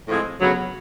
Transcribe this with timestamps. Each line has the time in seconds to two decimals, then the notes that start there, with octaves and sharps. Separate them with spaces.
0.08 A2 F3 G#3 C4
0.39 D2 C#3 F#3 B3